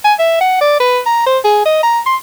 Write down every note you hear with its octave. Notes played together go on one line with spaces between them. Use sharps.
G#5
E5
F#5
D5
B4
A#5
C5
G#4
D#5
A#5
C6